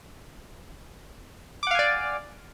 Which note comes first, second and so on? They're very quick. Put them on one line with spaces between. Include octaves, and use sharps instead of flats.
D6 F#5 F5 G#5 D5